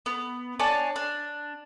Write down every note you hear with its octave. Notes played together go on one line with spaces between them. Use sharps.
B3
D4 C#5 G#5 A5
D4